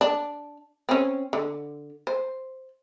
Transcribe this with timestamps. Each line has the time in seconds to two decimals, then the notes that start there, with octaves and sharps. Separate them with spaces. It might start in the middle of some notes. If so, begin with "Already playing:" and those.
0.01 D4
0.89 C4 C#4
1.33 D3
2.07 C5